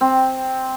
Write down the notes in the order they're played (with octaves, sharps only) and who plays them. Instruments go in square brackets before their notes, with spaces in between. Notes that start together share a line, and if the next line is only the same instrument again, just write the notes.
[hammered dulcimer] C4